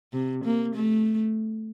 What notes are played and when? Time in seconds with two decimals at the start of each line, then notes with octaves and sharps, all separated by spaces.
0.13 C3
0.44 A#3
0.75 A3